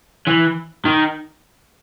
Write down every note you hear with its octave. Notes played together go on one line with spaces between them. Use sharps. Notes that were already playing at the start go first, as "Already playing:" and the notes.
E3
D#3